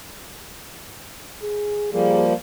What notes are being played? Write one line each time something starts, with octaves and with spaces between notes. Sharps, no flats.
G#4
F3 G3 A#3 G#4